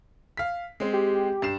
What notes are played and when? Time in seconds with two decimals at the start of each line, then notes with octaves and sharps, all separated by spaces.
0.37 F5 B6
0.80 G#3 C4
0.93 G4
1.42 G2 C7 E7